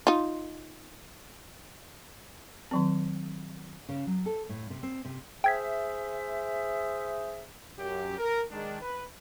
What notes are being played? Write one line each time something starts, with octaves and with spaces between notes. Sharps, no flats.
D#4 F4
D#3 F#3 C4
C#3
F#3
A4
A2
C3
C4
C3
G#4 C5 E5 G5 G#6 B6
F#2 G4
A#4
D#3 G#3 D4
B4